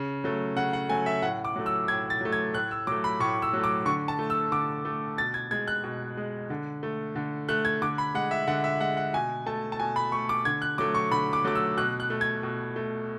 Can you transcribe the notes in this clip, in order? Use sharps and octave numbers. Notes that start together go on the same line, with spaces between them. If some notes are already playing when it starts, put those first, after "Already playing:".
Already playing: C#3
F#3 A3
C#3 F#5
F#5
F#3 A3 G#5
E5
A2 F#5
D6
F#3 A3
E6
A2 G#6
A6
F#3 A3
G#6
A2 F#6
E6
F#3 A3 D6
B5
A2 C#6
E6
F#3 A3
D6
D3 C#6
A5
A3
E6
D3 D6
A3
B2 A6
G#6
G#3 G#6
F#6
B2
G#3
D3
A3
D3
A3 F#6
G#6
D3 D6
B5
G#3 F#5
E5
D3 F#5
E5
G#3 F#5
F#5
B2 G#5
A3 A5
A5
B2 G#5
B5
A3 C#6
D6
D3 G#6
F#6
F#3 A3 D6
C#6
D3 B5
D6
F#3 A3 D6
E6
B2 F#6
F#6
A3
G#6
B2
A3